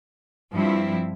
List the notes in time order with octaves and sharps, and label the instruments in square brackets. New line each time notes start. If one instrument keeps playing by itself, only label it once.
[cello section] G2 F3 C4 E4